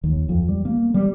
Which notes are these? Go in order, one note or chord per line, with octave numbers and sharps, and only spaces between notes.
D#2
F2
G3
A#3
G3